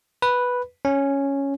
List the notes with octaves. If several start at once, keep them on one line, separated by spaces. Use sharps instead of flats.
B4
C#4